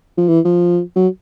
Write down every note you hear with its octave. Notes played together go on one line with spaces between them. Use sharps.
F3
E3
F3
F#3